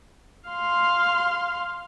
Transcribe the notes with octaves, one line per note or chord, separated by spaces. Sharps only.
F5 C6